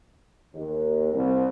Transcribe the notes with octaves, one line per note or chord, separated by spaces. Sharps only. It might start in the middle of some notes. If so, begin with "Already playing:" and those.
D#2
C2